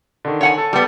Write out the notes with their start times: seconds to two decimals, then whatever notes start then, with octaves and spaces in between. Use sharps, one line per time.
0.25 D3 D#3
0.41 C#5 F#5 G#5
0.57 A4 A5
0.73 G3 B3